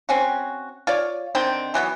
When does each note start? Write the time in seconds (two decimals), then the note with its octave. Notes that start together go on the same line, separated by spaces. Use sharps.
0.09 C4 C#4 F#4
0.87 F4 C#5 D5
1.35 D3 D#3 C4 G5
1.74 E3 F#3 A#3 B3